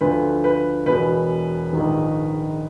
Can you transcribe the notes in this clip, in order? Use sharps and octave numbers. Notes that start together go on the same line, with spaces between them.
D2 D3 F3 B4
B4
E1 E2 B2 B4
A#1 G#2 D#3